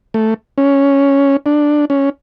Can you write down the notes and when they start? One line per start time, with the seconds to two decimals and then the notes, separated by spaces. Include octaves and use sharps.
0.14 A3
0.58 C#4
1.46 D4
1.90 C#4